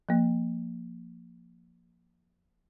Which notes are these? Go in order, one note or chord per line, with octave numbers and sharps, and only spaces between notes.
F3 A#3